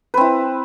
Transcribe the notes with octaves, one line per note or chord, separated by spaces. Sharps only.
C4 E4 B4